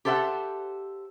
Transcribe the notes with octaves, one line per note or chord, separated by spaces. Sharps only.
G4 A4 C5 E5 F#5